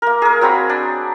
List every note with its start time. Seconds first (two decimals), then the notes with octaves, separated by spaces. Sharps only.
0.02 A#3 A#4
0.22 G#4 A#4
0.41 F#3 C4 A#5 B5
0.69 D4